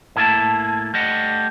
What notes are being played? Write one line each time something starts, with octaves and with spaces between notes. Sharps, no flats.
A2 A#3 E4 A5
G3 A3 D#5 F#5